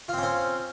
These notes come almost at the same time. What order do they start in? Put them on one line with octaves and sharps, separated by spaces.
F4 C4 C#4 C5